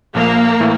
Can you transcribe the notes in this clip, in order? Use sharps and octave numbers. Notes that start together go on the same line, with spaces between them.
A#1 A#2 F3 A#3
A2 E3 A3